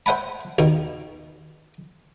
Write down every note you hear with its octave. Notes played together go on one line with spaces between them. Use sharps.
C5 E5 F#5 A5 B5
D#2 B2